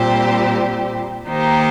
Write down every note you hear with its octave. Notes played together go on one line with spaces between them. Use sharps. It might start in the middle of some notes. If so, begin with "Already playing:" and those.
Already playing: A#2 G3 C4 G4 C5
D#3 A#3 D#4 G4 C5